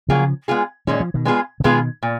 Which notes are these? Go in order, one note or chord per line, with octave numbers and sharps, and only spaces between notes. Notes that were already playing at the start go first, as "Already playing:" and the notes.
C#3 F3 F#3 A#3 F4 G#4
G#3 B3 F4 G#4
A#2 D#3 G#3 C#4
F3
B2 D#3
G#3 B3 F4 G#4
C#3
B2 D#3 G#3 B3 F4 G#4
A#2